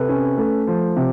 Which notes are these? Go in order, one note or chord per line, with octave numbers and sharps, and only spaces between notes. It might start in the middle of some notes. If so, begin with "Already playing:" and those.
Already playing: C3 A4 B4
C#4
A3
F3
C3